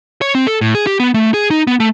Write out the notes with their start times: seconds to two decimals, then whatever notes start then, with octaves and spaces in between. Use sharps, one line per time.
0.21 C#5
0.35 C4
0.47 A4
0.61 A2
0.75 G#4
0.87 G4
1.00 B3
1.14 A3
1.34 G#4
1.51 D#4
1.67 B3
1.80 A3